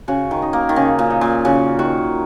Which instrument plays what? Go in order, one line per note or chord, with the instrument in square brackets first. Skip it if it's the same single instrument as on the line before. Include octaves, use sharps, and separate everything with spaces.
[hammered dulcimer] C#3 [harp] F#4
[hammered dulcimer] D#3
[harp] D#4
[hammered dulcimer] A#3
D#3
[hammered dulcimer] C#3 [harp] D#4
[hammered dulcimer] A#2
[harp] D#4
[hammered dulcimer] A#2
[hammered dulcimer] C#3 [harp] F#4
[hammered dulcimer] D#3 [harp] F#4